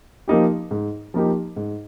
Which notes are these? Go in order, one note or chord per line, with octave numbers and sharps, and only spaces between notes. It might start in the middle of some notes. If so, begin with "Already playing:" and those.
F3 A#3 D#4 G4
G#2
F3 A#3 D#4 G4
G#2